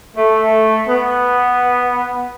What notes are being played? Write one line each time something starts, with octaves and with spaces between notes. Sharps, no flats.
A3
B3